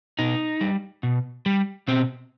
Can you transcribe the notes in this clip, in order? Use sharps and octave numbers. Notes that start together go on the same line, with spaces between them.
B2 D#4
G3
B2
G3
B2 C4